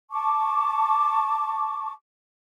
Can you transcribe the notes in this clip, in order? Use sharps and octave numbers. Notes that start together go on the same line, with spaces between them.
A5 C#6 D6